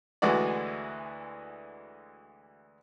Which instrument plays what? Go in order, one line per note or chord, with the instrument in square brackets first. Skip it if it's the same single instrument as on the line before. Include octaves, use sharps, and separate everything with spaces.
[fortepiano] D2 E3 G#3 F#4 B4 D5